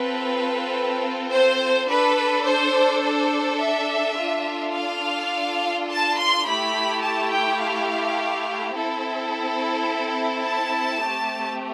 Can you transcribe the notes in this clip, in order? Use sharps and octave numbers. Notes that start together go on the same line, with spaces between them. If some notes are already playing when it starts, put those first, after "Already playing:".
Already playing: C4 F4 A4 B4
C5
D4 A4 B4
C5
C5
E5
D4 F4 A4
F5
A5
C6
A3 E4 G4 B5
A5
G5
F5
C4 E4 A4
A5
A3 C4 G4